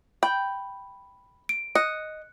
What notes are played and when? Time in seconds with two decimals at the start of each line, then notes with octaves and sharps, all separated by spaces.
0.23 G5 B5
1.49 D7
1.75 D#5 F#6 C#7